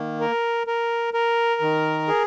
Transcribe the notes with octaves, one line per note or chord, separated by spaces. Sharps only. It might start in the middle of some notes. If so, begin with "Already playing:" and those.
Already playing: D#3 A#3
A#4
A#4
A#4
D#3
G#4